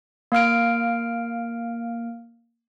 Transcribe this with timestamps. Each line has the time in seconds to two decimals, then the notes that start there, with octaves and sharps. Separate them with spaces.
0.32 A#3 F5 F6 D7